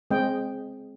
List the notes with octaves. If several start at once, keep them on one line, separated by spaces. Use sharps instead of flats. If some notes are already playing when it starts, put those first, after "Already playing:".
G#3 C4 D#5 G5